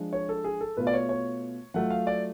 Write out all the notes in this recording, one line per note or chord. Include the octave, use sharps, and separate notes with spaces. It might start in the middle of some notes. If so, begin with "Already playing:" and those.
Already playing: F3 G#3 D4
C#5
A4
G#4
A4
B2 A3 F4 B4
D5
C#5
C#5
F#3 A3 F4 F#5
F5
D5